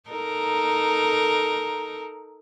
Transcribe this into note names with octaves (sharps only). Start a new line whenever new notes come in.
D#4 A4 A#4